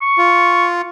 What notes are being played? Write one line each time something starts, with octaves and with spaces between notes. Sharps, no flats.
C#6
F4